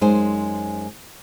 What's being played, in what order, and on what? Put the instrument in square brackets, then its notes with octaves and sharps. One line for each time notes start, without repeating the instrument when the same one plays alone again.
[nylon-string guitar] F#2 G#3 D#4 C5 G#5